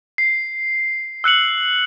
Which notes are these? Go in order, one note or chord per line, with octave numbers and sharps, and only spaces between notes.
C7
E6 F#6 C#7 F#7